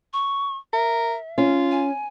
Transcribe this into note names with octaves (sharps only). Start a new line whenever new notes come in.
C#6
A#4 E5
C#4 F4
G#5